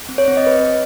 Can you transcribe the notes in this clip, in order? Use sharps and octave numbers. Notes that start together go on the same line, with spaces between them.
C4
C#5
C4
D#5
B4